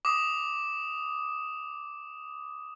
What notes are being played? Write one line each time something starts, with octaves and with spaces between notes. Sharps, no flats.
D6 D#6